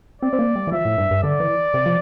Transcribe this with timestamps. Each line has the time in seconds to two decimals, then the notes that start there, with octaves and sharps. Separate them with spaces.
0.22 C4 D5
0.33 C4
0.39 A#3
0.56 G3
0.67 E3
0.72 F3 E5
0.85 A2
0.98 G2
1.11 G2
1.23 D3 D5
1.40 E3
1.74 C3
1.86 F3